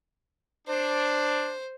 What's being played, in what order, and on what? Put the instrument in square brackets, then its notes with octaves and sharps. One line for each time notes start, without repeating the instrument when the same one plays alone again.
[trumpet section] D4 [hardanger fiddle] C5